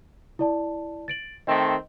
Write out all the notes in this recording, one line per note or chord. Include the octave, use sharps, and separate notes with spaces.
E4 D5 A5
A6 D7 F#7
D#3 A3 C4 D#5 G5